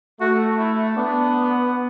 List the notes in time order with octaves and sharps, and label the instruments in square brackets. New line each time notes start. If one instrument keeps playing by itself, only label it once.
[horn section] A3 [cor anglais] F#4
[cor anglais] E4
[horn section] B3 [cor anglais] D4